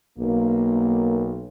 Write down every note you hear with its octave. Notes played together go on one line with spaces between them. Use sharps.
B1 A#3